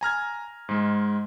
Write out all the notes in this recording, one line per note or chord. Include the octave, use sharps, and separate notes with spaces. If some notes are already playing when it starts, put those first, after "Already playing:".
G#5 A#5 F6 G#6
G#2 G#3